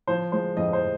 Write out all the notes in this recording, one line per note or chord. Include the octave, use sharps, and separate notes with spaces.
F3 C5
G#3 C5
F2 D#5
C5